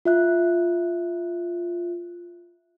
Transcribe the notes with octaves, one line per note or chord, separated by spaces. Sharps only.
F4 E5 F#6